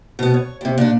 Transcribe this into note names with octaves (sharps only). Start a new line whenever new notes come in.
B2 B3
C#5
D#2 C3
A#2 D4